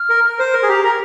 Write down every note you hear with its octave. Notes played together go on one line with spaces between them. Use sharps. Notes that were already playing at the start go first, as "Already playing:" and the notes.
Already playing: F6
A#4
A#4
C5
A#4
G#4
G4 A#5
A#4 A#5